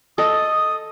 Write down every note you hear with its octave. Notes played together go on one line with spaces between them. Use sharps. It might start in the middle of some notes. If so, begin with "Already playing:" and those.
A4 D#5 D#6